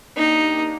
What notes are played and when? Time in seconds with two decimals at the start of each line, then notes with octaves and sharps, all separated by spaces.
0.16 A#3 D4 D#4 G4